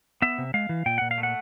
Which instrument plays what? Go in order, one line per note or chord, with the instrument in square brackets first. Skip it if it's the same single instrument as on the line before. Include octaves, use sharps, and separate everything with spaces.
[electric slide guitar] B3 E5
C3
G#3 F5
E3
A#2 G5
A#2 F#5
F5
A3
F#5